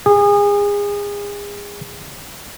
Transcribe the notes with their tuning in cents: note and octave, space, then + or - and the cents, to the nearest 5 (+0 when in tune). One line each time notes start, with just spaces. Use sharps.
G#4 -30